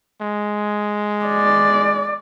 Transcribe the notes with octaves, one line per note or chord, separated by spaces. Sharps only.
G#3
D5